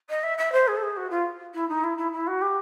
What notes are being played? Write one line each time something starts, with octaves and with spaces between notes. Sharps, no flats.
D#5
E5
E5
C5
G#4
A4
G#4
F#4
F4
E4
D#4
E4
E4
E4
F#4
G4